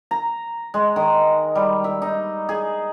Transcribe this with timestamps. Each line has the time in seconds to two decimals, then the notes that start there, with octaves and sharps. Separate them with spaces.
0.11 A#5
0.74 G#3
0.96 D#3
1.55 G3
1.84 E5
2.02 D#4
2.49 G#4